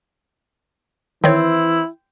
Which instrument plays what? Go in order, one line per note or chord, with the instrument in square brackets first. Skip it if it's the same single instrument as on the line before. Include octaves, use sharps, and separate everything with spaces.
[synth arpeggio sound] D#3 C#5 [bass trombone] E3 [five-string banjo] C4 [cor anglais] E4